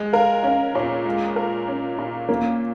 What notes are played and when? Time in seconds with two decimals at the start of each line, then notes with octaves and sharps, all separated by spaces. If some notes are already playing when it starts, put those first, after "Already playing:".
Already playing: G#3 D#5
0.13 A#4 F5
0.43 C#4 F5
0.75 A#2 C#5
1.05 G#3
1.36 A#4
1.68 C#4
1.99 A#2
2.29 A#3 C#4